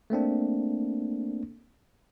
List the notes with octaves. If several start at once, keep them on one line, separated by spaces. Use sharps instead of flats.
A3 A#3 C4 D4